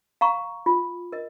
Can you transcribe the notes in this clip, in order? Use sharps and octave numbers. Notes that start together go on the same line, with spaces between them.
F5 A#5 C#6
F4
A#4 D#5